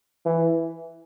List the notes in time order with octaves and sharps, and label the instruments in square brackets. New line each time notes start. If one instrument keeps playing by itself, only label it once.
[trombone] E3